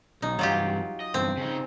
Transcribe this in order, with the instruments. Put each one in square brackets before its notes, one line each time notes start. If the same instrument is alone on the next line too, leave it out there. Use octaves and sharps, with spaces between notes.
[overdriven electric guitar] B1 [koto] D#4
[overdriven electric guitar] G2 E3 [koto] F#3 F4 G4
[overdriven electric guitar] D#5
[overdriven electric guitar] E2 G2 [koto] C4
[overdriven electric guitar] C#3 D#4